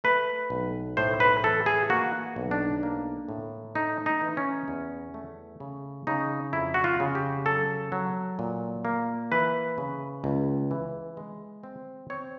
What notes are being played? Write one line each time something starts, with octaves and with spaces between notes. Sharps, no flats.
A3 B4
B1
A2 C5
B4
E3 A4
G#4
A#3 F#4
B1
D4
A#3
A2
A3 D#4
D#4
E3
C#4
E2
A3
C#3
C#3 D#4
F2 E4
F#4
F4
C#3
G4
F#3 A4
F#3
A#2
A#3
E3 B4
C#3
C#2
E3
G#3
C4
C4 C#5